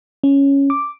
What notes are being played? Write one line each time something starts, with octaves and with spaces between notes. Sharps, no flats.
C#4
D6